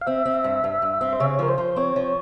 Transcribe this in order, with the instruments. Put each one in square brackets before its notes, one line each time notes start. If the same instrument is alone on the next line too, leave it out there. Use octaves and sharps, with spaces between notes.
[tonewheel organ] F5
[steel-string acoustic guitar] C4 [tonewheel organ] E5
[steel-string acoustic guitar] C4
G2
G2
G2
C4
[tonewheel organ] C5
[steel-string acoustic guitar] C#3 [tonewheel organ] C#5
[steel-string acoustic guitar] F3 [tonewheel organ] A#4
[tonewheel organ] C5
[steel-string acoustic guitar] F3
[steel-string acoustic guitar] C4 [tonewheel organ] C#5
[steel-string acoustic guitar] F3